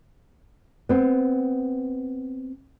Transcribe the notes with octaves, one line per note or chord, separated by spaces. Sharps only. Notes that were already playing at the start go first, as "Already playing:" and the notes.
B3 C4